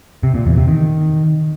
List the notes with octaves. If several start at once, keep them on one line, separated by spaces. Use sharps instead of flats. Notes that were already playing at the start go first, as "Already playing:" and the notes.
C3
A#2
E2
C3
D#3